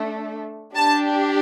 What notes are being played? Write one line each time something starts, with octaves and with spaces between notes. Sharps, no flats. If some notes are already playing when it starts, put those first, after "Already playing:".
Already playing: A3 D4 A4
D4 G4 A5